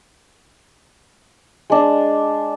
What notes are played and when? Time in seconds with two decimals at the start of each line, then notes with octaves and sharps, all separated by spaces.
1.70 G#3 D4